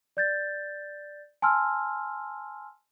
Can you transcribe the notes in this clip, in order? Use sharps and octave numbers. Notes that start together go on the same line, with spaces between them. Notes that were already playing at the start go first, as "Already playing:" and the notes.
D5 G6 A6
G#5 A5 C6 E6 F6